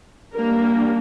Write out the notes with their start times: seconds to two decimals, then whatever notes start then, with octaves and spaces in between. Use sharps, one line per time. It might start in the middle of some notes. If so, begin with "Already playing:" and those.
0.33 G3 A#3 D4 A#4